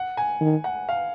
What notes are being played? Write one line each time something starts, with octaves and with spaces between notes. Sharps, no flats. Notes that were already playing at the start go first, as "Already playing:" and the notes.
Already playing: F#5
G#5
D#3
F#5
F5